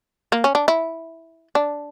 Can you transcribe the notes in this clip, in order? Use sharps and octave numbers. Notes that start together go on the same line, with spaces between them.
A#3
C#4
D4
E4
D4